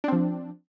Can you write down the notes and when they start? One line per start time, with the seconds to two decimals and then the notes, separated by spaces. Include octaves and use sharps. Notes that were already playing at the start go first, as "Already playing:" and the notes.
0.04 D4
0.08 C4
0.12 F3